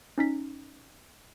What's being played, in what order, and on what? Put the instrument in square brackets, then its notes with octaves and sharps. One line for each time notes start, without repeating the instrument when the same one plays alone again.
[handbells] C#4 D#4 B6